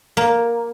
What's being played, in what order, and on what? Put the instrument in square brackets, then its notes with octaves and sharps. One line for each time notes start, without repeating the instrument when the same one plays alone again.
[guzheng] A#3